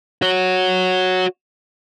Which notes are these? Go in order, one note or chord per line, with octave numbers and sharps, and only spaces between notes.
F#4 C#5